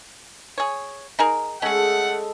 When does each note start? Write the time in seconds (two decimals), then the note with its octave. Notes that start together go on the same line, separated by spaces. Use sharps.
0.58 G#4 C#5
1.19 D#4 G#4 A#4
1.62 G#3 A3 C#4 G#4 A4 F#5